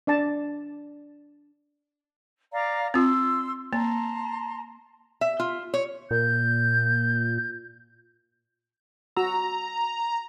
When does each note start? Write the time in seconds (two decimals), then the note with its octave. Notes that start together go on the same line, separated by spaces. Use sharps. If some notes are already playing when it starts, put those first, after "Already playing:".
0.07 D4 D5 A5
2.53 D5 F5 A#5
2.94 C4 F4 C6 E6
3.73 A#3 A5 A#5 C6
5.21 E5
5.40 F4
5.74 C#5
6.11 A#2 G6
9.17 F#4 A#5 E6